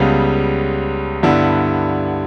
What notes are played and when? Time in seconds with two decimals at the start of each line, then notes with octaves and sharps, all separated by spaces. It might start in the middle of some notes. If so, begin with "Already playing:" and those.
Already playing: C#2 C#3 G3 B3
1.23 G2 D3 G3 B3 E4